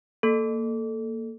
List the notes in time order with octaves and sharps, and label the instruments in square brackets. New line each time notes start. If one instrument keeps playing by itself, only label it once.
[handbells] A#3 A4